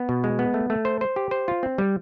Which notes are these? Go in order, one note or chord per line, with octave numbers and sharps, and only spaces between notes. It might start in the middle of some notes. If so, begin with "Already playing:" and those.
Already playing: B3
B2
G#3
B3
A3
A3
C5
C5
G4
C5
F4
C4
G3